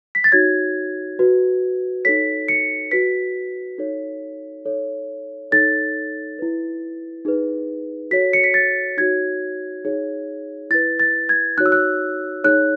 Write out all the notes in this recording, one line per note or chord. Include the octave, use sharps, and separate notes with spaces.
B6
A6
D#4 F#4 C#5 G#6
F#4 B4
D#4 A4 C#5 B6
C#7
F#4 B4 B6
D#4 A4 C#5
D#4 A4 C#5
D#4 A4 C#5 A6
E4 B4
D#4 G#4 B4
F#4 A4 C#5 B6
C#7
B6
A6
D#4 F#4 C#5 G#6
D#4 G#4 C#5
E4 B4 A6
A6
G#6
D#4 F#4 C#5 F#6
E6
F#6
D#4 G#4 C#5 F#6